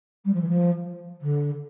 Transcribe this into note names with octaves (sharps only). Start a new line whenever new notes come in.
G3
F3
E3
F3
D3